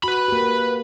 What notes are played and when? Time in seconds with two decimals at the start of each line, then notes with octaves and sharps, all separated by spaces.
0.04 F#4 B4 B5
0.28 A#3 G4